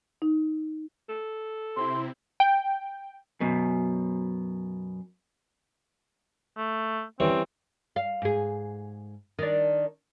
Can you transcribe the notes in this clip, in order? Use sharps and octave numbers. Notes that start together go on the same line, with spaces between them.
D#4
A4
C3 C4 E4 C6
G5
F#2 B2
A3
E3 G3 C4 C#4
F5
G#2 G#4
D#3 D4